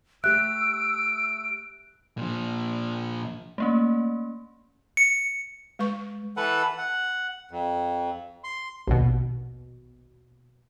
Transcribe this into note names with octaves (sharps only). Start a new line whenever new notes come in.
A3 G4 E5 E6 F#6 D7
A#2 F3
A3 A#3 C#4
C#7
G#3 B4 C#6
E3 A4 B4 F#5
F#5
F2
C6
A#1 D#2 B2